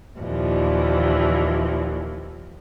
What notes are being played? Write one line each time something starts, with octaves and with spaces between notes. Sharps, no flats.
D#2 A#2 E3 F3